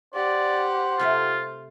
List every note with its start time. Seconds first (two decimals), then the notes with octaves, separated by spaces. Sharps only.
0.14 G4 C5 D5 F#5
0.99 C3 A3 F4 E5